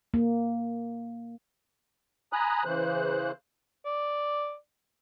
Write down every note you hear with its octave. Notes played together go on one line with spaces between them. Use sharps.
A#3
G#5 A#5 B5 D#6 F#6
C#3 E3 C5 F#6
D5